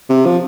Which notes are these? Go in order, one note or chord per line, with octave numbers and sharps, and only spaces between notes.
C3
F3